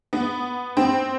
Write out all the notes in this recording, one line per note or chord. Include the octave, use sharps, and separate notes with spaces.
B3
C4